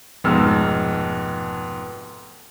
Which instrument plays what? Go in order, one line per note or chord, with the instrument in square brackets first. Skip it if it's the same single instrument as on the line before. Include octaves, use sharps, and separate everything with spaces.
[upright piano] F1 G#2 B2 E6 F6